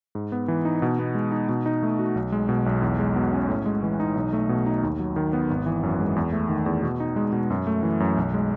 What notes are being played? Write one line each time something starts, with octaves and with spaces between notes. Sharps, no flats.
G#2
B3
E3
D#4
B2
B3
G#3
D#4
B2
D#4
A3
F#4
B1
G#3
B2
B1
E2
G#3
B2
C#4
A2
G#3
E3
D#4
B1
A3
B2
D#4
D#2
F#3
D#3
B3
G#1
E3
F#2
G#3
E2
A3
D#3
E2
B2
D#4
G#3
B2
F#2
A3
E3
F#2
B1
G#3